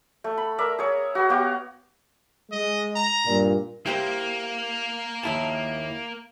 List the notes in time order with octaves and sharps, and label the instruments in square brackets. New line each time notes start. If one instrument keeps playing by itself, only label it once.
[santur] A3
B5
A#4 D5 E5
G#4 C#5
F#4 B4
B3 F#4 G4 F5
[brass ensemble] G#3 [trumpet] D#5
[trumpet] A#5
[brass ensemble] G2 A#2
[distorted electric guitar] A#3 [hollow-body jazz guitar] E4 G4 C5
[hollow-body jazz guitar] D#2 E4 A5